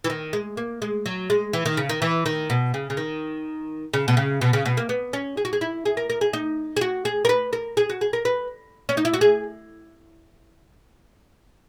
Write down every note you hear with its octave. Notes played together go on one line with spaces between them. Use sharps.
E3
D#3
G#3
A#3
G#3
F#3
G#3
E3
D#3
C#3
D#3
E3
D#3
B2
C#3
C#3
D#3
C#3
B2
C#3
B2
C#3
B2
A#3
B3
C#4
G#4
F#4
G#4
E4
G#4
A#4
A#4
G#4
D#4
G#4
F#4
G#4
A#4
B4
A#4
G#4
F#4
G#4
A#4
B4
C#4
D#4
E4
F#4
G#4